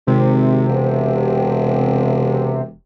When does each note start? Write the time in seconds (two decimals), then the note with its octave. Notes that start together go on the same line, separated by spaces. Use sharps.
0.07 G#1 C3
0.69 E1